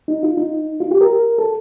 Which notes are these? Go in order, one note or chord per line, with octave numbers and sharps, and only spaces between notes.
D#4
F4
D#4
F4
G4
A#4
A4